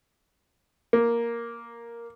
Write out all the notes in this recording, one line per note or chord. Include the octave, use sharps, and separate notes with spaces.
A#3